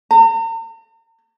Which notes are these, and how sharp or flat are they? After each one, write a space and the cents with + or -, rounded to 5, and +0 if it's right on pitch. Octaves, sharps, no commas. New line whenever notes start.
A#5 -45